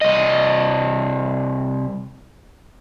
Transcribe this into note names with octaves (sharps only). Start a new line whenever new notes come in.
C2 D#5